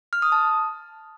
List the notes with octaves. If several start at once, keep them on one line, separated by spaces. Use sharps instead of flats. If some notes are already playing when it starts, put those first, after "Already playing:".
F6
D#6
A5